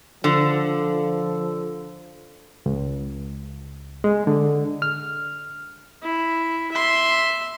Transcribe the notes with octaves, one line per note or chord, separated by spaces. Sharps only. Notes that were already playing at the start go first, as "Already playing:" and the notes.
D3 F3
C#2
G#3
D3
F6
E4
E5 C6